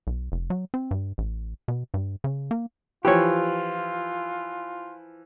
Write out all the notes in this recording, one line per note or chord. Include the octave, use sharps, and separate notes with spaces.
B1
F1
F#3
C4
G2
A1
B2
G2
C#3
A#3
E3 F3 F4 G4 C#5